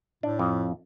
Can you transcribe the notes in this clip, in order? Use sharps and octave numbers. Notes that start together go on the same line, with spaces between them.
A2 D4
F2